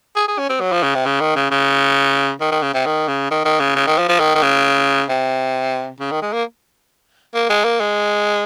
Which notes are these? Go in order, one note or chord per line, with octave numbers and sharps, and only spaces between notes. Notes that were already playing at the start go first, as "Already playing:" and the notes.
G#4
G#4
C#4
C4
F#3
F3
C#3
C3
C#3
D#3
C#3
C#3
D#3
D#3
C#3
C3
D#3
C#3
D#3
D#3
C#3
C#3
D#3
F3
F3
D#3
D#3
C#3
C3
C#3
D#3
G#3
A#3
A#3
G#3
A#3
G#3